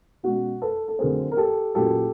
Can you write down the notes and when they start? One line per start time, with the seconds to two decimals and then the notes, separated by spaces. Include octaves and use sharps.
0.23 B2 G#3 C#4 F#4
0.62 A4 B4
0.88 A4
0.99 D3 F#3 A3 C4 G#4 A#4
1.32 A#4
1.37 G4 A4
1.75 A#2 F#3 A#3 C#4 G4 A4